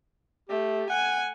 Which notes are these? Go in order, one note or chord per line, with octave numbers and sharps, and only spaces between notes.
A3 G4
F#5 G#5